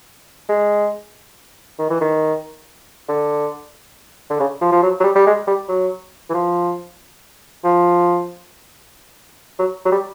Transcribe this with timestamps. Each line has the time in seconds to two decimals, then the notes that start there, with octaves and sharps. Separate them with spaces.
0.49 G#3
1.79 D#3
1.90 E3
2.01 D#3
3.09 D3
4.30 D3
4.40 C#3
4.61 F3
4.72 F3
4.82 F#3
5.00 F#3
5.04 G3
5.15 G3
5.26 G#3
5.47 G3
5.68 F#3
6.30 E3
6.34 F3
7.64 F3
9.59 F#3
9.85 F#3
9.92 G3